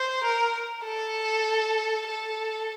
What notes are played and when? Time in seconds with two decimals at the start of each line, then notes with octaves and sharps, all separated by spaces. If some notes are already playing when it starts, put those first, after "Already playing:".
Already playing: C5
0.24 A#4
0.85 A4
2.07 A4